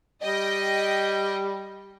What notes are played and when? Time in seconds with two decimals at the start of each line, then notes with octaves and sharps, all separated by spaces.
0.23 G3 D#5 G5